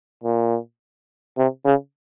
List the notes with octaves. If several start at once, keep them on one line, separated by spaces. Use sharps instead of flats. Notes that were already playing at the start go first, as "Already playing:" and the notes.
A#2
C3
C#3